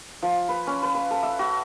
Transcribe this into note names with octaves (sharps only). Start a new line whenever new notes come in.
F3
B4
C#4
B4
B4
A4
E5
F#4